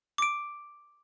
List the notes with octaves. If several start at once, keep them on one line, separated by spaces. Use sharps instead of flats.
D6 D7